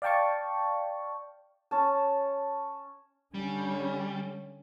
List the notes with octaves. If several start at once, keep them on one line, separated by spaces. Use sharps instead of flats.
D5 F5 G5 A5 C#6
C#4 A5
D3 G3 C#4